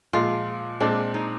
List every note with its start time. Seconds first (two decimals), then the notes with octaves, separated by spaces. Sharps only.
0.13 A#2 F3 G#3 F4
0.80 A#2 G#3 C4 D4
1.14 D#4